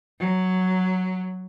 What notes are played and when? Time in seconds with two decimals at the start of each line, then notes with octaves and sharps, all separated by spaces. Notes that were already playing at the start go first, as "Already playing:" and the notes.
0.19 F#3